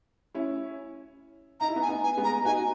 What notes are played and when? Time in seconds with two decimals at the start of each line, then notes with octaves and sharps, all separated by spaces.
0.34 C#4 E4
1.60 D#4 A#5
1.68 E4
1.76 B3 D#4
1.82 G#5
1.89 B3 D#4
2.03 G#5
2.17 G#3 B3
2.24 A#5
2.45 D#4 F#4 G#5